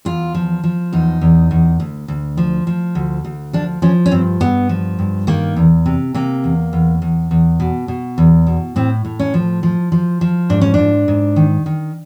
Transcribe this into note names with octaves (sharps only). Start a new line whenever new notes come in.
E2 F4
F3
F3
E2 D#4
E2
E2
D2
D2
F3
F3
D2
D2
F3 D4
F3 C#4
C#4
G2 C4
G2 B3
F3
G2
D#3 A#3
E2
C3
C3 A#3
E2
E2
E2
E2
B2
B2
E2
B2
A2 C4
A2
C#4
F3
F3
F3
F3
G#2 D4
C#4
G#2 D4
G#2
D#3
D#3